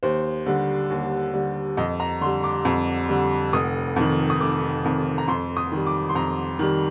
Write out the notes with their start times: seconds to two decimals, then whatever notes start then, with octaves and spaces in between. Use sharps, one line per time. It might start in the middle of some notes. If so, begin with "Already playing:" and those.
0.03 D#2 C5
0.46 D3 G3
0.90 D#2
1.34 D3 G3
1.77 F2 D#5
2.00 A#5
2.21 D3 C6
2.26 G3
2.44 D6
2.65 F2
3.09 D3 G3
3.53 F1 D#6
3.96 F2 D#3
4.30 D#6
4.40 F1 D6
4.85 F2 D#3
5.18 A#5
5.28 F2 C6
5.57 D#6
5.72 D#3 G3
5.86 D6
6.09 C6
6.15 F2 A#5
6.59 D#3 G3